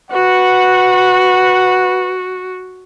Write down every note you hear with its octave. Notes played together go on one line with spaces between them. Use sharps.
F#4 B4 F#5